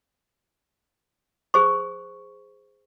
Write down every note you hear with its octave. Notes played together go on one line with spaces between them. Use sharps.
G#4 C5 C#6